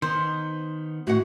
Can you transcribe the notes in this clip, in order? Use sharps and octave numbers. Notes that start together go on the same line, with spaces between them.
D#3 B3 D#4 C5
A2 F#4 F#5